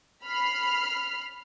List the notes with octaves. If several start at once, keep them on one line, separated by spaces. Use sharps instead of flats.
B5 F6 C7